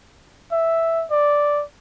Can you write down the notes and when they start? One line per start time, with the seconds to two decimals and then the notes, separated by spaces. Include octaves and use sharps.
0.52 E5
1.11 D5